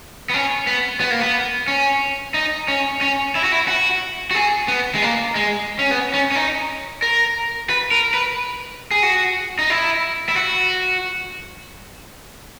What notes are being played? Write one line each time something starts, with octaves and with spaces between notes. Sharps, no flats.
B3
C#4
B3
B3
A#3
B3
C#4
D#4
C#4
C#4
E4
F#4
E4
F#4
F#4
G#4
B3
G#3
A#3
G#3
C#4
B3
C#4
C#4
D#4
A#4
B4
A#4
B4
G#4
F#4
D#4
E4
E4
F#4